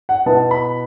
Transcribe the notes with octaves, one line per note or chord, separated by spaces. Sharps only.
F#5
B2 B3 E4 A5
B5